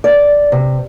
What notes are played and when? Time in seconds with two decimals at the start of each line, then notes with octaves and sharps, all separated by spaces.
0.04 D5
0.52 C3